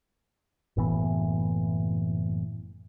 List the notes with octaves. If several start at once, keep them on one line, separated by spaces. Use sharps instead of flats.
F#1 A2 E3 B3